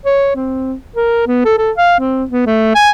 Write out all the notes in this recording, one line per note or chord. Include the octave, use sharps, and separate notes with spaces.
C#5
C4
A#4
B3
A4
A4
F5
C4
B3
A3
G#5